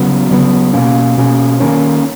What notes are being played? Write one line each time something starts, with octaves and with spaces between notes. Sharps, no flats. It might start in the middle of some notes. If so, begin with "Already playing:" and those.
Already playing: C#3 F#3 B3
C#3 F#3 B3
B2 A#3 C#4
B2 A#3 C#4
D#3 A#3 C#4